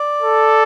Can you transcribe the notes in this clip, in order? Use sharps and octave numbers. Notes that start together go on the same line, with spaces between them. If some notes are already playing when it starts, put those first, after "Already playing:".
Already playing: D5
A4